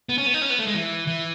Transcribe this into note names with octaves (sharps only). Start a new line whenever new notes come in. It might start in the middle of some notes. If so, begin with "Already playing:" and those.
B3
C#4
B3
D#4
C#4
B3
A3
G#3
E3
E3